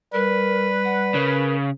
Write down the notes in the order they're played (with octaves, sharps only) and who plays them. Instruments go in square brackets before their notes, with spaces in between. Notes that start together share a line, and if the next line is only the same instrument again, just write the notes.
[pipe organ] G3 [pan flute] A#4 [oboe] B4
[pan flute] F#5
[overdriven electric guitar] C#3 [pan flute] A#4